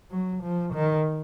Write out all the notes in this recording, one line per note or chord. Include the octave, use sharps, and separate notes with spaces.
F#3
F3
D#3